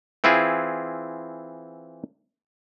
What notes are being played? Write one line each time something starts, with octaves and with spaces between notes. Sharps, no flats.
E3 C4 E4 F4 G#4